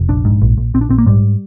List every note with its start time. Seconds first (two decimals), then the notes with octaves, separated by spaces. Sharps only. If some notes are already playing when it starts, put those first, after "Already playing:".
Already playing: F1
0.09 A#1 D4
0.25 G#2
0.42 A#1
0.58 A#1
0.74 A#1 C4
0.81 D4
0.89 A#1 C4
0.98 A#3
1.06 G#2 G3